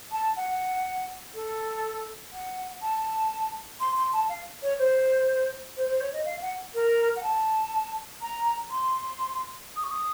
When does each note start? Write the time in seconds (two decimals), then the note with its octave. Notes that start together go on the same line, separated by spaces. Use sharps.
0.12 A5
0.36 F#5
1.34 A4
2.33 F#5
2.82 A5
3.80 C6
3.97 C6
4.13 A5
4.29 F5
4.62 C#5
4.78 C5
5.76 C5
5.89 C5
6.01 C#5
6.13 D#5
6.25 F5
6.42 F#5
6.74 A#4
7.16 F#5
7.23 A5
8.21 A#5
8.70 C6
9.76 D#6
9.83 C#6
9.91 D#6